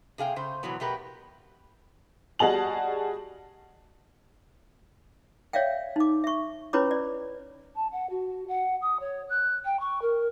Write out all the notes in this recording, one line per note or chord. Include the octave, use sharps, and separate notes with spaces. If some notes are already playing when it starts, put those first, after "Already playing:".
C3 G#4 F5 G5
C#3 C5
B2 E3 F#3 B3
B2 A3 G4 A#4 B4
G3 F#4 G#4 D#5 A5 F#7
C#5 D5 E5 F5 G5
D#4 D6
E5 C#6
C#4 E4 B4 C#5 B5 D6
D5
A5
F#5
F#4
F#5
D#6
C#5
F#6
G5
C#6
A#4